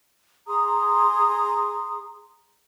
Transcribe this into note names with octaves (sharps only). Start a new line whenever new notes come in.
G#4 A#5 C6 D#6